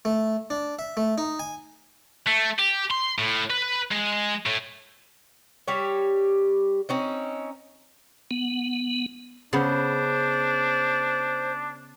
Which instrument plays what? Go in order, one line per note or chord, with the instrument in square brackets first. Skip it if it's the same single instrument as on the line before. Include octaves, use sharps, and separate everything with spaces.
[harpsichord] A3
D4
E5
A3
D#4
G#5
[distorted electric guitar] A3
G4
C6
A2
B4
G#3
A2
[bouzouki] G3 G4 C#5
C4 C#4 D#4
[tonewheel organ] B3
[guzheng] C#3 B3 [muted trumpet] D4 [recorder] C5